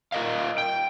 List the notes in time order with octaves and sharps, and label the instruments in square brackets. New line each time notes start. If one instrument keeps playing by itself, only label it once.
[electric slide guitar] F4 A#4 D#5 F5
G5